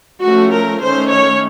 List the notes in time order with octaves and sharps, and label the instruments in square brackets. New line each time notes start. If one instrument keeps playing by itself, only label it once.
[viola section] F3 A3 C#4 F#4
A#4
D#3 A3 C#4 C5
C#5